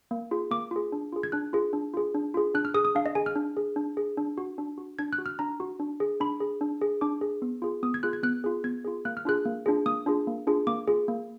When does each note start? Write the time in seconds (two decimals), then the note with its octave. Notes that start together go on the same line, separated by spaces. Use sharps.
0.11 A#3
0.31 F4 G#4
0.51 A#3 D6
0.71 F4 G#4
0.92 D4
1.13 F4 G#4
1.23 G#6
1.32 D4 F#6
1.53 F4 G#4
1.73 D4
1.94 F4 G#4
2.15 D4
2.34 F4 G#4
2.54 D4 F#6
2.65 F6
2.74 G#4 D#6
2.85 D#6
2.95 D4 F5
3.06 D#5
3.15 G#4 G#5
3.26 F6
3.36 D4
3.57 G#4
3.76 D4
3.97 G#4
4.17 D4
4.38 F#4
4.58 D4
4.78 F#4
4.99 D4 G#6
5.13 F#6
5.18 F#4
5.26 F6
5.39 D4 A#5
5.60 F#4
5.80 D4
6.00 G#4
6.20 D4 B5
6.40 G#4
6.61 D4
6.81 G#4
7.01 D4 D6
7.21 G#4
7.42 B3
7.62 F4 G#4
7.83 B3 D#6
7.94 G#6
8.03 F4 G#4 F#6
8.13 G#6
8.23 B3 F#6
8.44 F4 G#4
8.64 B3 G#6
8.85 F4 G#4
9.05 A#3 F#6
9.17 F6
9.25 D4 F4 G#4 F#6
9.45 A#3
9.66 D4 F4 G#4
9.86 A#3 D#6
10.06 D4 F4 G#4
10.27 A#3
10.47 D4 F4 G#4
10.67 A#3 D6
10.87 F4 G#4
11.08 A#3